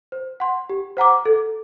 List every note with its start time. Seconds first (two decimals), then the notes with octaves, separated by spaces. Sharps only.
0.12 C5
0.40 F#5 C6
0.70 G4
0.97 C5 F#5 A#5 D6
1.25 A4